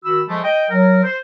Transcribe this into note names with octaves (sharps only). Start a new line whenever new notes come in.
D#3 F#4 B5 E6
F3 G#3 A3
D#5 G5
F#3 A#4
C5